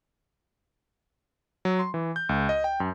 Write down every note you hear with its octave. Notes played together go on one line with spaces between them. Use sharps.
F#3
C6
E3
G6
C#2
D#5
G5
F#2